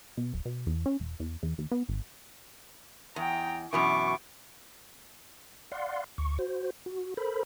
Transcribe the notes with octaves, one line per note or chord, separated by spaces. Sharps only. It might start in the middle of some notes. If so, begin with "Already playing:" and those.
B2
D1
B2
E2
C#4
E1
E2
E2
D#2
B3
G#1
E2 G5 A#5
F#2 B2 E3 C#6 D6
D5 F5 F#5 C6
D2 C#6
F#4 C5
F#4
A4 A#4 C5 B5